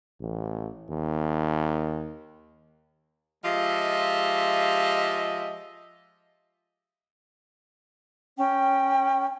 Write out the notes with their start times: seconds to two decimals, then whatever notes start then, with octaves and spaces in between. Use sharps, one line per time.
0.21 A1
0.90 D#2
3.44 F3 G#3 F4 G4 D#5 E5
8.38 C#4 G5